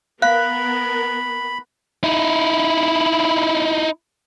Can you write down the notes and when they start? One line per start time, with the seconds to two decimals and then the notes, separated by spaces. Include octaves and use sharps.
0.22 B3 A#4 F5 B5 F#6
2.04 D#4 E4